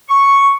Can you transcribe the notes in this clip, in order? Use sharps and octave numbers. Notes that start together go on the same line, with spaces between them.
C#6